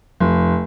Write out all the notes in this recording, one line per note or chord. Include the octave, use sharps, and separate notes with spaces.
F1